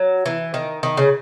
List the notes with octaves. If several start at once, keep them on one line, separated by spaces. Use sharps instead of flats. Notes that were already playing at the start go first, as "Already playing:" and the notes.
Already playing: F#3
E3
D#3
D#3
C#3